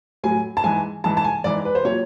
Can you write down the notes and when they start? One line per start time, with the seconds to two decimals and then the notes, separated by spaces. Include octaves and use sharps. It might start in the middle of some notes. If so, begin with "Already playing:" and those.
0.24 A2 F#3 G#5
0.57 A5
0.64 G#2 E3 G#5
1.04 G#2 E3 A5
1.17 A5
1.24 G#5
1.44 G#2 E3 D5
1.65 B4
1.75 C5
1.85 A#2 F#3 C#5